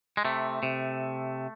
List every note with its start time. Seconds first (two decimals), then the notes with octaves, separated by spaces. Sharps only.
0.17 G#3
0.25 C3 A3
0.63 C3